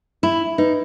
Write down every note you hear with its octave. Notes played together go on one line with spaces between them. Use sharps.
E4 B5
D#4 B4